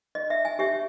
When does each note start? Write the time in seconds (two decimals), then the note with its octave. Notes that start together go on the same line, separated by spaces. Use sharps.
0.15 D#5
0.30 E5
0.45 G#5
0.59 G4 C#5 E5